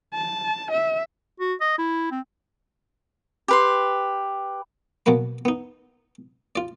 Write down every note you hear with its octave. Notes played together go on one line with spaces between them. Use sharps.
A5
E5
F#4
D#5
E4
C4
G4 B4 C6
B2 F#3 A#3 B4 B5
B3 D#4
F4 D5